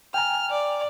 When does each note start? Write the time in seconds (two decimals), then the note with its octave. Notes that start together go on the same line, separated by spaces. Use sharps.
0.14 G5 G#5 A#5 F6
0.50 D5